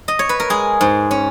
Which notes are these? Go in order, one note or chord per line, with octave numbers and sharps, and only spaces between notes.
D#5
C#5
B4
A#4
G#3 G#4
G#2
C#4